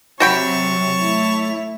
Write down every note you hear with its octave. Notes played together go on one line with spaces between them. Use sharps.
C3 F#3 F#4 C#5 G5 A5 B5 C#6
A3 E4